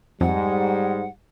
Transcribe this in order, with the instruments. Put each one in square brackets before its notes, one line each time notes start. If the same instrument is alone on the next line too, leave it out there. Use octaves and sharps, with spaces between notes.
[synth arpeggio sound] F2 [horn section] G#2 [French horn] G3 [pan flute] F#5